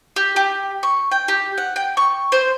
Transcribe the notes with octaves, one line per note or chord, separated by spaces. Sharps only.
G4
G4
C#6
G5
G4
F#5
G5
C#6
C5